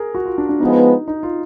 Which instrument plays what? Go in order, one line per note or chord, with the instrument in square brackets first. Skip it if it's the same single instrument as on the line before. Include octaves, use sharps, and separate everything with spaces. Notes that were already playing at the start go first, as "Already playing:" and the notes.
Already playing: [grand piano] G#4 A#4
F#4
F4
D4
D4
[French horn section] F3 G#3 B3 [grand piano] D#4
[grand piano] D#4
F4